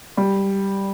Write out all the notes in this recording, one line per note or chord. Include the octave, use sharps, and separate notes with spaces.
G3